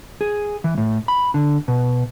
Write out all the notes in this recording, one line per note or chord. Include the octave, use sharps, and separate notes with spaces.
G#4
E3
A2
B5
D3
B2